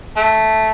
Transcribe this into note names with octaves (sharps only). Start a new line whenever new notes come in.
A3